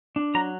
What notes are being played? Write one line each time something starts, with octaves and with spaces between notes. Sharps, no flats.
D4
F#3 A#5